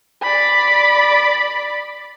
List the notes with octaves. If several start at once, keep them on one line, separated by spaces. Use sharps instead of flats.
D5 B5